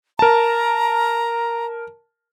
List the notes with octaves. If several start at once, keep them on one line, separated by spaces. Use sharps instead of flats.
A#4 A5 A#5